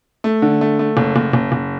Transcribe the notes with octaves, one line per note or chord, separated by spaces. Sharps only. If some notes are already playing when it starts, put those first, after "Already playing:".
A3
D3
A3
A3
F#1
F#1
F#1
F#1